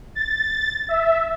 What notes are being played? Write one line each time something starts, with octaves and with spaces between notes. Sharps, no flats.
A6
E5